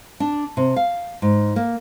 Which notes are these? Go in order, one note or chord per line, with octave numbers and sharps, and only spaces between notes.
D4
C3
F5
G#2
A#3